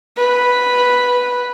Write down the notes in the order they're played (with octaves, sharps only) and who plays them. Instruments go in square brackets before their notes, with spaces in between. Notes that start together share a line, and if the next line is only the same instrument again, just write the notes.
[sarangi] B4